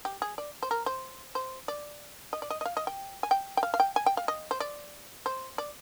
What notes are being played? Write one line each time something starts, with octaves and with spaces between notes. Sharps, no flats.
G4
G#4
D5
C5
A#4
C5
C5
D5
D#5
D5
D#5
D#5
F5
D#5
G5
G#5
G5
G5
F5
F5
G5
G#5
G5
F5
D#5
C5
D5
C5
D5